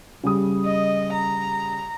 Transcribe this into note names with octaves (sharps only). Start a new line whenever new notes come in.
C#3 G3 D#6
D#5
A#5